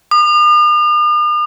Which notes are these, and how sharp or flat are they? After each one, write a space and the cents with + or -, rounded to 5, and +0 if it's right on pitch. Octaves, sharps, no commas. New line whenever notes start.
D#6 -45